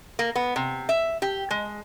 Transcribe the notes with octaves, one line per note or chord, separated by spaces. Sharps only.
A#3
B3
C3
E5
G4
G#3